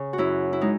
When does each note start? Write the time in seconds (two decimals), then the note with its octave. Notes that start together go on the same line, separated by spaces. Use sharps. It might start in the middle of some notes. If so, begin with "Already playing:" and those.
Already playing: C#3
0.13 F#4
0.18 F#2 E4
0.53 E4
0.61 G#3 D#4